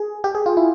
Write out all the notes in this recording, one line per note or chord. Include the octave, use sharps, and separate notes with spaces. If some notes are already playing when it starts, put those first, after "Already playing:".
Already playing: G#4
G4
G#4
F4
E4